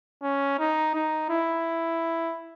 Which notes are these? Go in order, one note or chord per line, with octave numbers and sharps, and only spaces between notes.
C#4
D#4
D#4
E4